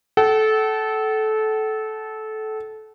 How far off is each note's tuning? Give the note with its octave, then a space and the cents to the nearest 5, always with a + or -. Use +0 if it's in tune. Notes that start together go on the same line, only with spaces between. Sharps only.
A4 -20 F#5 +45